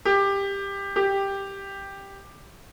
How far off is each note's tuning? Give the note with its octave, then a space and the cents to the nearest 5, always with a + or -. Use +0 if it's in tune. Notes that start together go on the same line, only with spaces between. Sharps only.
G4 +15
G4 +5